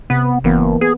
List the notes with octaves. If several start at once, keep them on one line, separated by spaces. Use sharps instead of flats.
C3 B3
F#1 E3 A#3 B3
B3 G#4